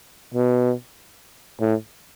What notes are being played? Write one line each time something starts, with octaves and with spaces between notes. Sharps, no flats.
B2
A2